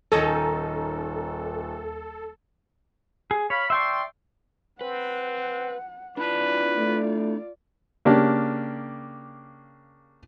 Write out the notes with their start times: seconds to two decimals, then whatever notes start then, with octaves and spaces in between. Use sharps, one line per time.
0.12 D#1 D#3 C#4 D#4 A4
3.31 G#4
3.50 C#5 F5 B5
3.70 F3 D5 E5 G5 C6 C#6
4.81 C4 B4 F#5
6.17 D4 E4 F4 B4 D5 A5
6.78 A3
8.05 C#3 A#3 D4 G4